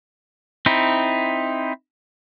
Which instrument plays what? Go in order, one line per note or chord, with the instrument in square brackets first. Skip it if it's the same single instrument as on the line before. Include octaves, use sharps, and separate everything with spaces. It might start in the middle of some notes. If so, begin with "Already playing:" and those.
[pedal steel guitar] C4 D#4 E4